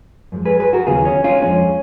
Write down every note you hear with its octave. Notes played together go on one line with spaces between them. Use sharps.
F#2 F3 G#3
G#4 B4
G#4 B4
F#4 A#4
D#2 C#3 F#3 B3 F4 G#4
C#4
C#4 F4
F2 F3 G#3 C#4